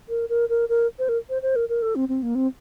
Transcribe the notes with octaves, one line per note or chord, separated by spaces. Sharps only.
A#4
A#4
A#4
A#4
C5
A#4
C5
C5
A#4
A#4
A4
C4
C4
A#3
C4